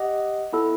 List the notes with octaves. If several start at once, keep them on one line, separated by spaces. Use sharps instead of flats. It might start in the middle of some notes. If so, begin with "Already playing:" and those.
Already playing: G4 D#5 F#5
B3 E4 A4